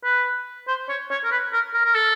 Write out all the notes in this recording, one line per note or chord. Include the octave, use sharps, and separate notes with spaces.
B4
C5
C#5
C#5
A#4
B4
A#4
A#4
A#4
A4